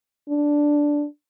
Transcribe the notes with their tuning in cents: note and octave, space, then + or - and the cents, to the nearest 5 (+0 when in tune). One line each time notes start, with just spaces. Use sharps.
D4 -5